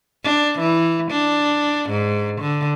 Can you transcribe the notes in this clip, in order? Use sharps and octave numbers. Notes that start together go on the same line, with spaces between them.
D4
E3
D4
G#2
D3